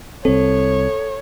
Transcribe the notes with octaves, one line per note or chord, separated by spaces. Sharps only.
C2 C4 A4 C#5